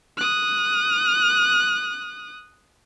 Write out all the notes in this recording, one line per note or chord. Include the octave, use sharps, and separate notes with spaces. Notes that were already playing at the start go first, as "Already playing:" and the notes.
D#6 F#6